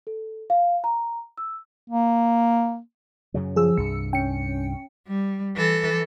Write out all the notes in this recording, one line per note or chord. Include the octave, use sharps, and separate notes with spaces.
A4
F5
A#5
E6
A#3
F#2 C#3 F#3
F3 G#4 E6
C2 G2 C#7
C#4 G5 C#7
G3
E3 A4